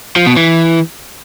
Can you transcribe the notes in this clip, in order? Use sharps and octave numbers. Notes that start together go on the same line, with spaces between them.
F3
B2
E3